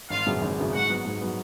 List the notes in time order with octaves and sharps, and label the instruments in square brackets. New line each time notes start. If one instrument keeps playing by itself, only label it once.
[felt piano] G#1 [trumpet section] F4 F5
[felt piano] F#2 C#3 F#3 B3
G#1
F#2 C#3 F#3 B3
[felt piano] G#2 [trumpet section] F#4 F#5
[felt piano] F#3 B3
G#2
F#3 B3